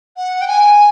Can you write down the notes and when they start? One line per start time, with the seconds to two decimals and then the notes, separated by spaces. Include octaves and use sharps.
0.17 F#5
0.41 G5
0.48 G#5